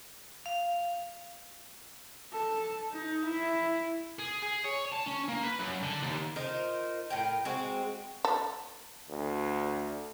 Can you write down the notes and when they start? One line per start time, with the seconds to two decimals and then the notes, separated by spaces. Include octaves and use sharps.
0.46 F5
2.32 A4
2.92 D#4
3.25 E4
4.19 G#4
4.43 G#4
4.64 C#5
4.92 A5
5.06 C#4
5.28 A#3
5.43 B4
5.59 F#2
5.83 D3
6.02 D#2
6.36 D#4 F4 A#4 C5
7.10 A2 A#4 G5
7.45 G#3 C4 F#4
8.25 A4
9.10 D2